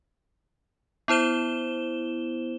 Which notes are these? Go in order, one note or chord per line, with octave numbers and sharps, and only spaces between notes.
B3 E4 C5 E7 G7